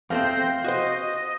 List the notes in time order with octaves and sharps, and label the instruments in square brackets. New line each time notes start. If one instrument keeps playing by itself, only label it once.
[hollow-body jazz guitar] F2 A3 C4 [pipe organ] C5 G6 A#6 [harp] F5
[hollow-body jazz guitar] F#4 C5 [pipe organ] D#5